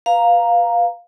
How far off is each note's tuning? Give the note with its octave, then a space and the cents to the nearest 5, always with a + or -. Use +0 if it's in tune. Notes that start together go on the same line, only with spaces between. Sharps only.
B4 +0 F5 +5 A#5 +0